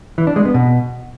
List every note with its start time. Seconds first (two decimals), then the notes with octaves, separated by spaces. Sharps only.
0.18 E3
0.27 D4
0.36 G#3
0.45 B3
0.54 B2